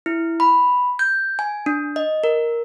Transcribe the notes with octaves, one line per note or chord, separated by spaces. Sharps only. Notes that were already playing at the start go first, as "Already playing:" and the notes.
E4
B5
G6
G#5
D4
D#5
A#4